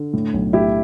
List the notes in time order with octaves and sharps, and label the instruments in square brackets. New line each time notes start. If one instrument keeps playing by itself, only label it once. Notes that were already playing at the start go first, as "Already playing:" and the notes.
Already playing: [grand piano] D3
A2
B1
A2 E4 G4